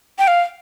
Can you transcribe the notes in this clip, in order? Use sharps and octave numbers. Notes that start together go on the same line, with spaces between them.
G5
F5